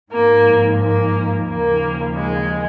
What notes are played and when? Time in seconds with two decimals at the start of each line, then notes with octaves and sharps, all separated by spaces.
0.12 G#2 F3 A#3
0.80 A#3
1.47 D#2 C#3 F3 A#3
2.14 G#3